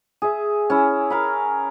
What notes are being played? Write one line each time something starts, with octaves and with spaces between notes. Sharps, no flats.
G#4 E5
C#4 E4
A#4 F5 B5